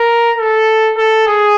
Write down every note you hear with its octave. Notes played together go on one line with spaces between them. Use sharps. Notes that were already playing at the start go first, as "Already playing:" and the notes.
Already playing: A#4
A4
A4
G#4